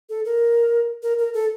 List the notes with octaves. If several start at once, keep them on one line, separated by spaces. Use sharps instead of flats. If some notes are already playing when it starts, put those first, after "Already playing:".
A4
A#4
A#4
A#4
A4